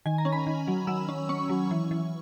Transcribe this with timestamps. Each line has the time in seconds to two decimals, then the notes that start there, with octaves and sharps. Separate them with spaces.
0.06 D#3 G#5
0.18 A#5
0.25 C#4
0.32 B5
0.47 D#3
0.68 F#3
0.87 F#3 E6
1.09 C#4
1.29 C#4 C#6
1.49 F#3
1.71 E3
1.91 E3